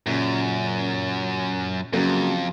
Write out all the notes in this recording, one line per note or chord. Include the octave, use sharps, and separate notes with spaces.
F#2 A#2 C#3
F2 C#3 F#3 A#3